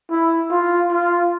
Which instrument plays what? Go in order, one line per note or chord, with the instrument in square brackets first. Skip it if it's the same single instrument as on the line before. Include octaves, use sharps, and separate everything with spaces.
[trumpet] E4
F4
F4